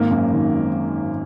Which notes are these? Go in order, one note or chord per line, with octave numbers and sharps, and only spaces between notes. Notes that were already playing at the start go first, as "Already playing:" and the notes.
Already playing: G#1 A#3
F#2
D#3